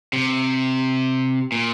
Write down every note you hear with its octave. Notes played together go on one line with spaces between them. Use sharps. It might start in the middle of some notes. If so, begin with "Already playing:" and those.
C3
A#2